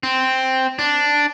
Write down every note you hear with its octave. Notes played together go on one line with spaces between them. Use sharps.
C4
D4